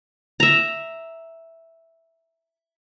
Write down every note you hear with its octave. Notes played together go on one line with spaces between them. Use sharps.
E5 A#5